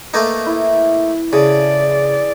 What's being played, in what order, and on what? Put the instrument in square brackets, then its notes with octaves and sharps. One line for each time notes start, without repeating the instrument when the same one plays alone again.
[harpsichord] A3 A#3 D#4 [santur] B4
[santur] E4
[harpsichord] C#3 [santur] G#4 A4 [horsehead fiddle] D5